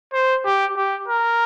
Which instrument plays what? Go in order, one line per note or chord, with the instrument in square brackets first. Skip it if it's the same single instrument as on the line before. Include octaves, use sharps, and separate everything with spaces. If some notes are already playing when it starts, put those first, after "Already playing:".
[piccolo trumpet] C5
G4
G4
A#4